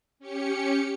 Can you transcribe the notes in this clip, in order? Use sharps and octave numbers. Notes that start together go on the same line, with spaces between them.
C#4 G4 C#7